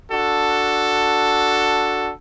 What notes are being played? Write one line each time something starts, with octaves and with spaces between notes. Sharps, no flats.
D4 F#4 A4